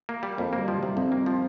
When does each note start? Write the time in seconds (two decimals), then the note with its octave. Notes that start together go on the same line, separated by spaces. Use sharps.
0.09 A#3
0.23 G3
0.38 F2 A#3
0.53 G3 A#3
0.68 F3
0.78 G3
0.83 C3
0.97 F2 C4
1.12 A#3
1.26 F3